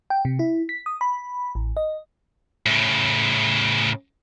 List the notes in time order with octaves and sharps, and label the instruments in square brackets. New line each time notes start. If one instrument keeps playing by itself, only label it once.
[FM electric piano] G5
C3
E4
B6
D#6
B5
A1
D#5
[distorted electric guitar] A2 C#3